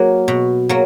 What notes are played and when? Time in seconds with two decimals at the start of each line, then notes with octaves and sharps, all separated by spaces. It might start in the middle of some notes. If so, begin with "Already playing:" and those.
Already playing: F#3 A#3 F#4
0.28 B2
0.69 F#3 A#3